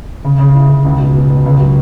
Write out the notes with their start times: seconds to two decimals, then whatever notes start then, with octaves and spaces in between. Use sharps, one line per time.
0.24 C#3
0.39 C#3
0.55 E4
0.69 C#3
0.84 C#2
0.99 B2
1.14 B2
1.30 B2
1.46 C#2
1.60 F#3